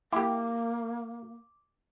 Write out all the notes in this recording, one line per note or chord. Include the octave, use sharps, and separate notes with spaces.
A#3 E4 G4 D6